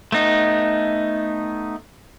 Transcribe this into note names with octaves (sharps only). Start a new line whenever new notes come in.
A3 B3 D#4